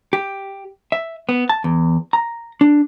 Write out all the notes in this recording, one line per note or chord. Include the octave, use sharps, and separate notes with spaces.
G4
E5
B3
A5
E2
A#5
D4